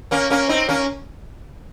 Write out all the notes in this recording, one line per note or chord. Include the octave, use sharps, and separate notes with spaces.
A#3 C#4
A#3 C#4
C4 D#4
A#3 C#4